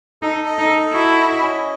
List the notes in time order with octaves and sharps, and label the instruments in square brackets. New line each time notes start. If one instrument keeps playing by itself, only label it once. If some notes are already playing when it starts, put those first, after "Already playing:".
[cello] D#4 [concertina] A4
[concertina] D#5
[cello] D#4
[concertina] A4
[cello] E4 [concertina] F#4
[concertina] D#5
C#4